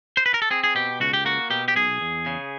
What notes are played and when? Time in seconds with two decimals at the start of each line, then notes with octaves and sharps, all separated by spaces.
0.17 C5
0.26 B4
0.34 A#4
0.42 A4
0.50 C4 G#4
0.64 G#4
0.75 B2 G4
1.00 C#2 F#4
1.13 G4
1.25 A#3 F#4
1.50 B2 G4
1.68 G4
1.75 B1 G#4
2.01 E2
2.26 C#3